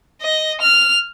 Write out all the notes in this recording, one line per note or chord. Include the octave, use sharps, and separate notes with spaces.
D#5
F6